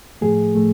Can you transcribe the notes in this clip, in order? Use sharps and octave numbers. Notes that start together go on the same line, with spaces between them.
A2 F3 A3 G#4
A2 F3 A3